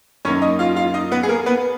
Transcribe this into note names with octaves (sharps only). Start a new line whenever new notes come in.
F#2 D#3 A#3 C#4 C#5
D#4 D#5
F4 F5
F4 F5
D#4 D#5
B3 B4
G#4
A#3 A#4
B3 B4